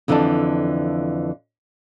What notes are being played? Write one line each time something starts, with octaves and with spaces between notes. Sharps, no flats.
F2 D3 E3 C4 D5 A5